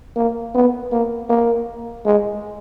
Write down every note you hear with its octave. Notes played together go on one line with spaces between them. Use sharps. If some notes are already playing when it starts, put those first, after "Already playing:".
A#3
B3
A#3
A#3
G#3